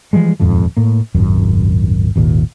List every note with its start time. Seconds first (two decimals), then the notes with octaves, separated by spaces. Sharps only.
0.13 E3 F3 G3 G#3
0.40 D#1 F2 G#2 F3
0.77 A2 A#3
1.14 D#1 G#1 F#2
2.16 G#1 D#2 A#2